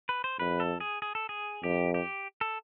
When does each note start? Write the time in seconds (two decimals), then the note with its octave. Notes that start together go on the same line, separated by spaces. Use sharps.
0.09 B4
0.24 C5
0.39 F2 B4
0.60 A4
0.80 G#4
1.02 G#4
1.15 A4
1.29 G#4
1.63 F2 G4
1.94 G4
2.41 A4